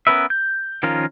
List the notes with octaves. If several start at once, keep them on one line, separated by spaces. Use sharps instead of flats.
B3 C#4 A#4 B4 E5
G6
D#3 F3 C#4 F4 A#4